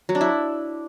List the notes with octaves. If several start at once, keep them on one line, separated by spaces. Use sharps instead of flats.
F#3
D4
E4